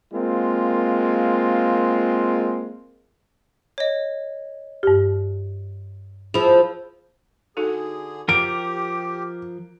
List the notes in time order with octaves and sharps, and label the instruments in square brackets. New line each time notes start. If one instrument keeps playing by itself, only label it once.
[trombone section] G#3 A#3 C4 F4
[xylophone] C#5 D#5
[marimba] G2 G4
[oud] F3 E4 [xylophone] G#4
[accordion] D3 G#4 [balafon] D#4 F#4 A4
[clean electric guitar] F3 A#4 [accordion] G4 [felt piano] D7